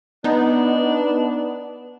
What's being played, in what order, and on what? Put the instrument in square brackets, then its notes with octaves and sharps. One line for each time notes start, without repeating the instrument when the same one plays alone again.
[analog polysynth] B3 D#4 [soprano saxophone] D4